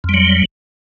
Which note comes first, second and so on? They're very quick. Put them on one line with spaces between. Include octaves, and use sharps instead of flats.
F2 G3 F#3